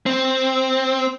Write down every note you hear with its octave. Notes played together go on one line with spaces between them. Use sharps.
C4